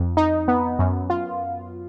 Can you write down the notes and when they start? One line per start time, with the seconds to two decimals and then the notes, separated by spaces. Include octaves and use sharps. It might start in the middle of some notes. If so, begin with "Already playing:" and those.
Already playing: F2
0.17 D#4
0.48 B3
0.79 F#2
1.10 F4